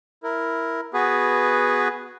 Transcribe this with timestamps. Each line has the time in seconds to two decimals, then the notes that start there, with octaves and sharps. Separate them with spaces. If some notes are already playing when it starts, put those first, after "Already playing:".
0.24 E4 A#4
0.94 B3 F#4 G#4 B4